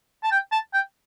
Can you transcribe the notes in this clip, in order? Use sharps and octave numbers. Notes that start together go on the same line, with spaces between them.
A5
G5
A5
G5